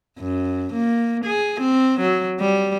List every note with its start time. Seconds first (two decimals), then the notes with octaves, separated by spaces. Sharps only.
0.19 F#2
0.74 A#3
1.25 G#4
1.61 C4
2.01 F#3
2.40 G3